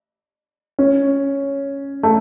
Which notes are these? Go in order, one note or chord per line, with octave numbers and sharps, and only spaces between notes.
C#4
A3